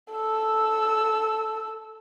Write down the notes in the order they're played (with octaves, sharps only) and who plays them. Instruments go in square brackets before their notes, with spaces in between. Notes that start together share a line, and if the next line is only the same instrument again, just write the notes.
[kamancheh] A4 E6